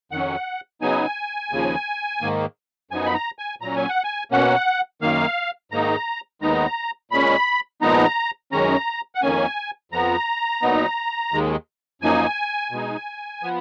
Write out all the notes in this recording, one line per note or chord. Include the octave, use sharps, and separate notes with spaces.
F2 D#3 F#3 C#4 F#5
C#3 F#3 B3 D#4 G#5
D#2 C#3 F3
G#2 D#3 A#3
F#2 F3 B3 D#4 G#5
B5
A#5
G#5
A#2 F#3 C#4 A#5
G#5
F#5
G#5
B2 A#3 C#4 F#5
F#2 D#3 A#3 F5
G#2 D#3 A#3 D#4 A#5
D#2 D#3 G#3 B3 D#4 A#5
A#2 G#3 C#4 B5
A#2 F3 G#3 B3 D#4 A#5
F#2 D#3 G#3 C#4 A#5
F#5
F2 D#3 A#3 C#4 G#5
F2 F3 B3 A#5
A#2 F#3 B3 D#4
D#2 D#3 G#3
F#2 F3 A#3 D#4 G#5
B2 G#3 D#4
F3 B3